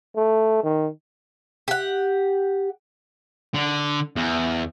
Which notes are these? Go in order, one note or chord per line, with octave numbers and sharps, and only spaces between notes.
A3
D#3
G4 F#5
D3
E2